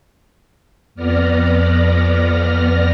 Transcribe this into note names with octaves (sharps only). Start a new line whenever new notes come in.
F2 B3 D5 F6 A#6